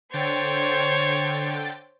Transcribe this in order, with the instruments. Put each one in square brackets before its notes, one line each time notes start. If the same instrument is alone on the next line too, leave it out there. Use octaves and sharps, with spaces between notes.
[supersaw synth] D3 G5 A6 [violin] C5 C#5